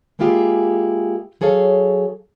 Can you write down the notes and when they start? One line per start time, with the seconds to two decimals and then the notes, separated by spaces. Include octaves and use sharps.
0.19 G#3 A#3 E4 F4 G4 G#4
1.41 F#3 G#4 A4 C#5 F5